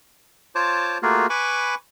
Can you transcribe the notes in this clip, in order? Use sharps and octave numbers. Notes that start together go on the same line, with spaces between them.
F4 C5 C#5 A5 D6
A3 A#3 F4 F#4 G#4 A#4
B4 G#5 B5 C#6 D6